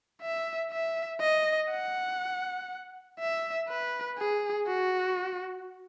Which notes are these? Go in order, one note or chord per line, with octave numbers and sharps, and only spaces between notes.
E5
E5
D#5
F#5
E5
B4
G#4
F#4